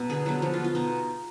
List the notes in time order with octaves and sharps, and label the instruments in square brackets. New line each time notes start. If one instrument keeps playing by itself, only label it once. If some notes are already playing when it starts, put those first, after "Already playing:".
Already playing: [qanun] B2 B3 A#4
D3 G#4
F#3 B3 F#4
F3 F#4
F4
B3
F4
B2 D#4